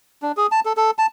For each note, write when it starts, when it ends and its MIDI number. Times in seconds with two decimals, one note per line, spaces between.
0.22 0.32 62
0.37 0.47 68
0.52 0.60 81
0.65 0.73 69
0.77 0.91 69
0.99 1.06 81